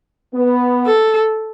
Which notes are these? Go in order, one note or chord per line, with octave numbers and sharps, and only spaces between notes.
B3
A4